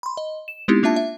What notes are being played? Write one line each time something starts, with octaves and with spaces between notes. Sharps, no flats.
B5 C6
D#5
E7
G#3 B3 C4 D#4 E4 G4
A#3 D4 F4 E5 A5
E5